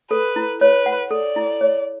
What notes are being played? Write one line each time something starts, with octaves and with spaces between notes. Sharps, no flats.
A4 B4
E4
B4 C#5
F#5
A4 D5
E4
C#5